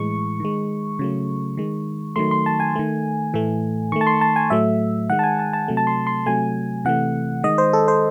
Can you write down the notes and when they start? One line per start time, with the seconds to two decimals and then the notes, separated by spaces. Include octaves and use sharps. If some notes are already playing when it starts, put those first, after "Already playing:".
Already playing: A2 E3 G#3 C#6
0.40 D#3 G#3
0.99 C#3 F#3 A3
1.57 D#3 G#3
2.16 D#3 F#3 A3 C6
2.31 C6
2.46 A5
2.60 G#5
2.75 D#3 A3
3.34 A2 E3 A3
3.92 D#3 A3 C#6
4.01 A5
4.07 C6
4.21 A5
4.36 G#5
4.50 A2 F#3 A3 E5
5.10 D#3 G#3 F#5
5.19 A5
5.23 G#5
5.39 A5
5.53 A5
5.68 C3 F#3 A3
5.77 A5
5.87 C6
6.07 C6
6.26 C3 F#3 A3 G#5
6.85 C3 E3 A3 F#5
7.44 D#3 G#3 D#5
7.58 C5
7.73 A4
7.88 C5